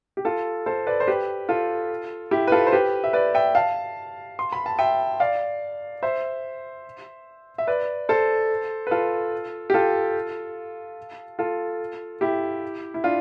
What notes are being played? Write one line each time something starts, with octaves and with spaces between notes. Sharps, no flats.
G4
F4 A4
A4 C5
B4 D5
C5
G4 B4
F4 A4
E4 G4
B4
F4 A4
C5
G4 B4
E5
B4 D5
E5 G5
F5 A5
C6
B5
A5
E5 G5
D5 F5
C5 E5
E5
B4 D5
A4 C5
B4
F4 A4
G4
F4 A4
F4 A4
E4 G4
E4
D4 F4